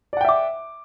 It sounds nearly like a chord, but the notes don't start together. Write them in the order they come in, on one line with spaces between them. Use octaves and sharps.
D5 F#5 G5 E5 D6